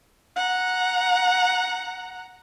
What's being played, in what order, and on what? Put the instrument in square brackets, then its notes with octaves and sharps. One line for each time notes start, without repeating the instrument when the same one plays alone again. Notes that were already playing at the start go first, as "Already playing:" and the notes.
[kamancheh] F#5 A#5